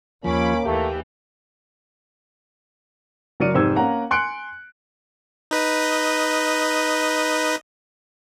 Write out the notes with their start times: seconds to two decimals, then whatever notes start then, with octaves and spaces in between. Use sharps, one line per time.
0.24 D#2 F3 A#3 C#4 B5 D6
0.65 D#2 E3 A3 G4
3.40 F#1 F#3 D5 F6 C#7 D#7
3.54 F1 G#2 G4 C5 E6 G#6
3.76 A#3 C#4 F#5 A#5
4.11 G#5 C6 F#6 C#7 D7
5.51 D#4 B4 D#5